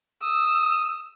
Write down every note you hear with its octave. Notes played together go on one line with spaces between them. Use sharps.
D#6 E6